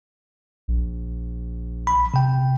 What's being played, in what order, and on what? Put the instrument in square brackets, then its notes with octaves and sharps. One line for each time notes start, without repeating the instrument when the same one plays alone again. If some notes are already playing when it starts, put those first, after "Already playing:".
[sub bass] A#1
[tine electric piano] B5
C3 G5